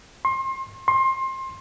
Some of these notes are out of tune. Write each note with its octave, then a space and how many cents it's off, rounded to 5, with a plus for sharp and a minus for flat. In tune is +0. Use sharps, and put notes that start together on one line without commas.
C6 +30
C6 +25